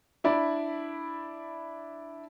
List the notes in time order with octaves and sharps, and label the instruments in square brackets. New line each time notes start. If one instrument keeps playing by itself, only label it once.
[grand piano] D4 E4 D5 B5